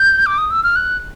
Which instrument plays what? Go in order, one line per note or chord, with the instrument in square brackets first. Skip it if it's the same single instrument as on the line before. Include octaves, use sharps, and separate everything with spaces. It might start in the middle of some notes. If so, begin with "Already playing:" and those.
Already playing: [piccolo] G6
D6
D#6
E6
F6
F#6